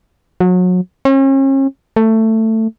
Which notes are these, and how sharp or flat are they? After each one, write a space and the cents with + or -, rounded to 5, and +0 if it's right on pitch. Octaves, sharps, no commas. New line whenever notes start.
F#3 -30
C#4 -40
A3 +15